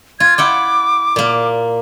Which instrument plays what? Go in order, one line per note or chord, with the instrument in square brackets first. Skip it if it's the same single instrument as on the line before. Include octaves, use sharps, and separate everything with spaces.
[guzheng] F4 [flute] G#6
[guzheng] E4 F#5 G5 [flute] D6
[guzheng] A#2 A#3